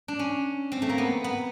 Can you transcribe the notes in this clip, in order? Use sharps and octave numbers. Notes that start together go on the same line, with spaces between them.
D4
C#4
C4
A3
A#3
B3
B3